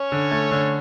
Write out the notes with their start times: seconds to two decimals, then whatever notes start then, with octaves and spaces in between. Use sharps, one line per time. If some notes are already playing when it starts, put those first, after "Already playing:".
Already playing: C#4 C#5
0.12 D3
0.31 A3
0.51 D3